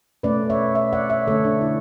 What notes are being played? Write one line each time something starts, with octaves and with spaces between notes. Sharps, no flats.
B2 A3 C#4 B4 D5
C#5 E5
C#5 E5
D5 F#5
C#5 E5
D3 A3 D4 A4 C#5
D4
E4